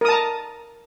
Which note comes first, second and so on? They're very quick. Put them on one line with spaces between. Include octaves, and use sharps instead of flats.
A#4 D#6 A5 A#5